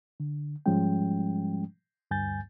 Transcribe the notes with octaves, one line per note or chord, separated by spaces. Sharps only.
D3
G#2 F3 G3 G#3 C#4 G5
D2 G2 G#5 G6 A6